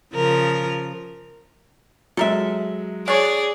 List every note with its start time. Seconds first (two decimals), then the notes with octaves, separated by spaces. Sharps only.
0.14 C#3 F3 A#4
2.17 F#3 G#3 A4 A#4 E5
3.08 D4 G#4 C#5 D5